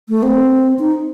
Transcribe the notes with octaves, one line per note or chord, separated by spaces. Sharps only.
A3
C4
D#4